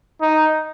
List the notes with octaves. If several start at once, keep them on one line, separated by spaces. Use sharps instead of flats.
D#4